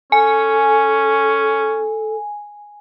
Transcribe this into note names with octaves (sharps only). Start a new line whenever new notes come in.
C#4 A4 G#5